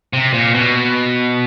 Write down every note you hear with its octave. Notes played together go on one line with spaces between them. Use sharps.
C3
A#2
B2